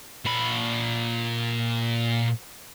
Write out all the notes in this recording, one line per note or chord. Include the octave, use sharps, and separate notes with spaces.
A#2 B5